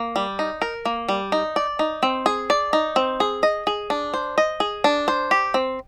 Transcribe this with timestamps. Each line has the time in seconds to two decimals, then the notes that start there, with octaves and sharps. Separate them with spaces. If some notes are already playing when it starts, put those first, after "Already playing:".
Already playing: A#3
0.16 G3
0.39 D#4
0.62 A#4
0.85 A#3
1.09 G3
1.32 D#4
1.56 D5
1.79 D#4
2.03 C4
2.26 G#4
2.50 D5
2.73 D#4
2.96 C4
3.20 G#4
3.43 D#5
3.67 G#4
3.90 D4
4.14 C5
4.38 D#5
4.60 G#4
4.84 D4
5.08 C5
5.31 G4
5.54 C4